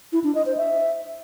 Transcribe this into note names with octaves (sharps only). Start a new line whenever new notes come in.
E4
D4
D#5
C5
E5